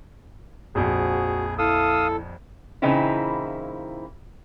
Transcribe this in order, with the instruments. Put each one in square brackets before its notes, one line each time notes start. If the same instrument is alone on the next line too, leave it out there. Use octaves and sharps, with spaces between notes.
[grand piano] A#1 F2 [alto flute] F#4 [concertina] G#4
[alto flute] E4 [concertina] A4 [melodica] F5 D#6 E6
[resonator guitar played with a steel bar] A#2 C#3 E3 C4 D#4 E4